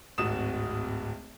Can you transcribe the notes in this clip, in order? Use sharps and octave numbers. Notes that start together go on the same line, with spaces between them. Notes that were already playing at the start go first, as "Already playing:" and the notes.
D1 G#1 F#4 D#6 E7